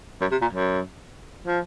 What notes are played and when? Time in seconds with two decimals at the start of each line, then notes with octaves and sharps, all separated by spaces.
0.21 F#2
0.31 C3
0.42 A#2
0.53 F#2
1.47 F3